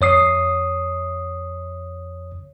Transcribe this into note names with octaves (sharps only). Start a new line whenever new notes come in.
F2 C#5 D#6 C7